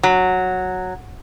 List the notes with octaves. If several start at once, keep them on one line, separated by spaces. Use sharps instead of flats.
F#3